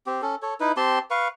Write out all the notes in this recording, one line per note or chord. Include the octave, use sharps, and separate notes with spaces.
C4 G4
C#4 A4
A4 C#5
D#4 E4 B4
C4 G4 A5 C6
B4 F5 C#6